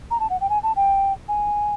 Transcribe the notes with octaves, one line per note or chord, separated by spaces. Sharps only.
A#5
A5
F#5
G5
G#5
A5
G5
G#5